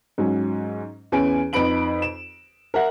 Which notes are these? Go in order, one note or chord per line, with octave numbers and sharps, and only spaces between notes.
G#2 F#3 C#4
E2 C#4 B4 G#5 D7
F2 D#4 B4 B5 D7 F#7
E7
A#4 E5 F#5